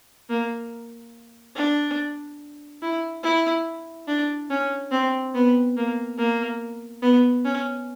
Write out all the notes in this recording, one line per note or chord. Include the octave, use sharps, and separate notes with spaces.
A#3
D4
E4
E4
D4
C#4
C4
B3
A#3
A#3
B3
C#4